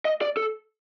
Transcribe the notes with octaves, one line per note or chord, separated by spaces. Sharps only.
D#5
D5
A4